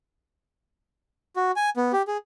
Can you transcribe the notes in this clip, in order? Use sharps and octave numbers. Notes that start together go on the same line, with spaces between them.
F#4
G#5
B3
G4
G#4